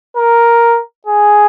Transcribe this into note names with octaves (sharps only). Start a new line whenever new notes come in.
A#4
G#4